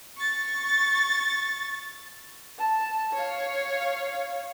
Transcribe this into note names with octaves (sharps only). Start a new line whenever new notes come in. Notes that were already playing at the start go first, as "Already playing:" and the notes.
C#6 A6
A5
C#5 F5